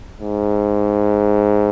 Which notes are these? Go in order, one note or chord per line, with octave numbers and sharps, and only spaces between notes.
G#2